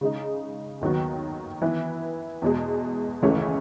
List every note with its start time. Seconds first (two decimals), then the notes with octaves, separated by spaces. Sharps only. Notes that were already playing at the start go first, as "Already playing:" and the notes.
0.01 C#3 G#3 D#4
0.81 D#2 D#3 F#3 B3 F#4
1.62 E3 B3 E4 B4
2.42 E2 B2 G#3
3.23 C#2 C#3 E3 A3 C#4